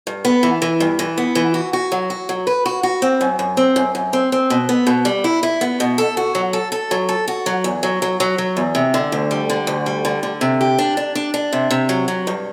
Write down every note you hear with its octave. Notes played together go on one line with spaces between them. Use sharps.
G2
B3
E3
E3
G2
E3
B3
E3
F#4
F#4
F#3
F#4
F#3
B4
F#4
F#4
C4
F#2
F#2
C4
F#2
F#2
C4
C4
B2
B3
B2
G3
E4
E4
B3
B2
A4
F#4
F#3
A4
A4
F#3
A4
F#4
F#3
E2
F#3
F#3
F#3
F#3
E2
C3
D3
D2
G3
D3
D2
G3
D3
D3
C3
G4
D4
D4
D4
D4
C3
C3
F#3
F#3
G2